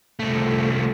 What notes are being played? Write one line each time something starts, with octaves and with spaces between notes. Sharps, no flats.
C2 A3